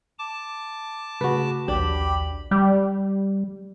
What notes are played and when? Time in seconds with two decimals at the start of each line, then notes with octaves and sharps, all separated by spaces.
0.19 A5 D6
1.21 C#3 A3 F#4 G#4 B4
1.68 A#1 D#2 D4 G4 B5
2.51 G3